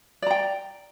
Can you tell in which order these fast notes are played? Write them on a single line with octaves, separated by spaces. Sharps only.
D5 A#5 G5